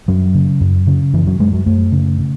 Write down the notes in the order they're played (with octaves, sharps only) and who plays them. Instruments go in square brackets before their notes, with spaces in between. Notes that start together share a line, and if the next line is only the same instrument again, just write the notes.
[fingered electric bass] F#2 F#3
C#3
F#2
C#3
F#2 E3
F#3
F#2 G#3
F#3
F#2 A3
C#3
C#3